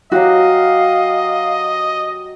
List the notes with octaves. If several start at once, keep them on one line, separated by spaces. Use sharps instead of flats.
F#3 F#4 G4 D#5 F5 D6